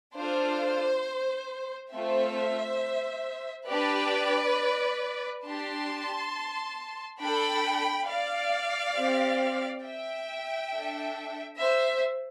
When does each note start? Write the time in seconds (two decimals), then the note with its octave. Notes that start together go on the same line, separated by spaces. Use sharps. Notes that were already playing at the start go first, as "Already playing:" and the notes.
0.15 D4 F4 A4 C5
1.91 A3 C4 F4 A4 C5 E5
3.67 D4 G4 B4 D5
5.43 D4 G4 A5 C6
7.19 D4 A4 G5 B5
8.07 D5 F5
8.95 C4 G4
9.83 E5 G5
10.71 D4 A4
11.59 C5 E5